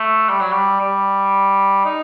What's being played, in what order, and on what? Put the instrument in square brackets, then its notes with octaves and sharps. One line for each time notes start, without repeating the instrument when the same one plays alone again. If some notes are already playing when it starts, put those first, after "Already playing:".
Already playing: [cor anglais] A3
G3
F#3
G3
G3
D#4